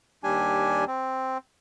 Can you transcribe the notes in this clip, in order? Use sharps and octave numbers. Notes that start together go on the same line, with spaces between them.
D#2 G3 D4 G4 G#5
C4